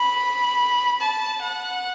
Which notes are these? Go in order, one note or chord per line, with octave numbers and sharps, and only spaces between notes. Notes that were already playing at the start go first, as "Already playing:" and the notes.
Already playing: B5
A5
F#5